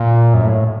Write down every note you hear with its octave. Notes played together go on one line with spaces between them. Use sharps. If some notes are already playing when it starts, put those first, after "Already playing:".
Already playing: A#2
F#2
A2